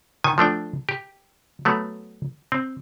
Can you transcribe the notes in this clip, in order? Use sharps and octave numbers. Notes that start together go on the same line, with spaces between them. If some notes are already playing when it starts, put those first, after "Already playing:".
D#3 G#5
F3 A3 D4 G5
G4
F#3 A3 B3
C4